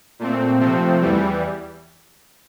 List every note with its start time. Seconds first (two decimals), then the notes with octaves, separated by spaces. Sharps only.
0.19 A#2 A3 C4
0.60 C3 F3 A3 C4
1.01 E2 E3 G3